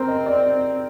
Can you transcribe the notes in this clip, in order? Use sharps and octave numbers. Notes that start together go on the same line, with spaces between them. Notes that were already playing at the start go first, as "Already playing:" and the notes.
Already playing: C4 A#4 C5
D#5
D5